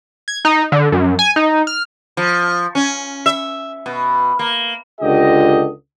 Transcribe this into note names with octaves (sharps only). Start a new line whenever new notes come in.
G#6
D#4
D3
F#2
G#5
D#4
F6
F3
C#4
E5
B2
A#3
C#2 D3 F4 G4 D#5